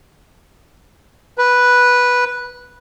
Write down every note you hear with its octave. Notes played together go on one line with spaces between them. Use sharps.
B4